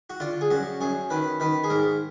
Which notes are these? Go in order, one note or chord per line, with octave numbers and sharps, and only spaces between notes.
F#4
D3 F4
G#4
F#2 F#4
F#2 G#4
D#3 B4
D#3 B4
G#4
G#2 A#4